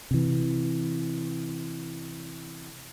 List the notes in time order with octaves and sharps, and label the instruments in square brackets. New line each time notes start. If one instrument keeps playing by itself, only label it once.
[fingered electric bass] C3 E3